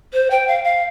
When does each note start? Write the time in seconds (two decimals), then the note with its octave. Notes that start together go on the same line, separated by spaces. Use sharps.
0.13 C5
0.31 G5
0.48 F5
0.64 F5